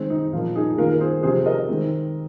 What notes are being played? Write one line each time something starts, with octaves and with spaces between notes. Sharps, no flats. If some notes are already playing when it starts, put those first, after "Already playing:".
Already playing: D#3 G#3 C4
D#4
A#2 F3 A#3 F4
D#4 G#4
D#3 A#3 F4 A#4
A#4
G#4 C5
C3 F3 C4 G#4 C5
A#4 D#5
D#3 G#3 C4